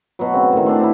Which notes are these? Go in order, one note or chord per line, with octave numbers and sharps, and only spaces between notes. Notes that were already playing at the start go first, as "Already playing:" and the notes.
B2 F#3
C#3 C4
A2 D#3
C4 D4
C4 E4